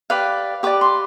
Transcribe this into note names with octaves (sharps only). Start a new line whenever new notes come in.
G4 B4 D5 F5
G4 B4 D5 D6
C6